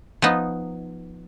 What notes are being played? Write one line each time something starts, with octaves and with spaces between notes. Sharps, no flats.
F3 B3 D#4